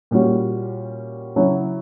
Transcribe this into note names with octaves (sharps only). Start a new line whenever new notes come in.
A#2 G3 C#4 F#4
C#3 F#3 C#4 E4